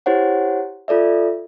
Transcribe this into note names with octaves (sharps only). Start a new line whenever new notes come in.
E4 G4 C5 C#5 F#5
F4 A4 D5 E5